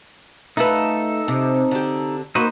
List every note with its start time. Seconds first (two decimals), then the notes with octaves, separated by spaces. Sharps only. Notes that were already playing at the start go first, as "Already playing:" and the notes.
0.57 A3 D#4 F4 A4 B4
1.28 C3
1.71 D3 G4
2.35 A#3 D#4 F#4 B4 C5